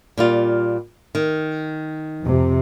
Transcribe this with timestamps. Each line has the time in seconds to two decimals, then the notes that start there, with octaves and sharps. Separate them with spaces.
0.18 A#2 G3 F4
1.15 D#3
2.22 F2 C3